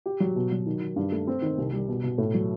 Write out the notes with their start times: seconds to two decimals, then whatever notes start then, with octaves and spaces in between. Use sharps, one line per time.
0.06 G4
0.20 F#3
0.36 B2
0.52 F#3
0.66 D#3
0.81 D#3
0.96 G2
1.12 A3
1.27 C4
1.42 D#3
1.58 C2
1.73 G3
1.88 B2
2.04 B2
2.18 A2
2.34 F#3